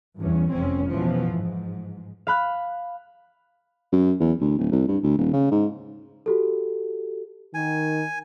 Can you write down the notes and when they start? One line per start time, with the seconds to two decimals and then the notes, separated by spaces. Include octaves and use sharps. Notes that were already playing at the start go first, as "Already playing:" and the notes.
0.19 E2 G2 C#4
0.52 F1 F2 C4 C#4
0.90 B2 E3 F3
1.36 G#2
2.27 F5 B5 F#6
3.92 F#2
4.20 E2
4.40 D2
4.58 D1
4.72 C2
4.88 G2
5.03 D2
5.18 D#1
5.33 C#3
5.51 G#2
6.26 F#4 G4 A4
7.54 D#3 G#5